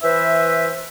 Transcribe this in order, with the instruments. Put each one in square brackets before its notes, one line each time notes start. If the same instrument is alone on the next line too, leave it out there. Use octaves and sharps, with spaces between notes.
[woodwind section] E3 B4 C5 E5